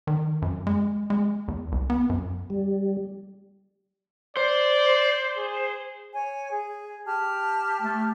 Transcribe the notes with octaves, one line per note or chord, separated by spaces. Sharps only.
D#3
F#2
G#3
G#3
E2
C2
B3
F#2
G3
C5 D5
G#4
C#5 G#5
G#4
G4 A5 F6
A3